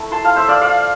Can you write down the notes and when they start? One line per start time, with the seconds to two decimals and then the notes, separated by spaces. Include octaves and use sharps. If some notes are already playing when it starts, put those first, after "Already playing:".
Already playing: A3 E4
0.12 A5 C6
0.24 F5 A5
0.36 C5 E5
0.48 D5 F5
0.61 D5 F5